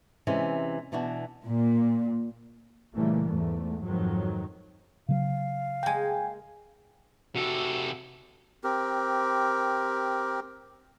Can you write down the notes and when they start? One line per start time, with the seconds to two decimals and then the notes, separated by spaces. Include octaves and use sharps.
0.27 C3 E3 G#3 C#4
0.92 B2 E3 D4 F#4
1.45 A#2
2.94 A#2 C#3 E3 G3 A3 A#3
3.27 E2 G#2 A3
3.83 F2 G#2 D#3 F#3
5.09 C#3 F#3 F5
5.83 G#3 A#3 G5 G#5
7.35 C3 F#4 A4
8.64 C4 G4 A#4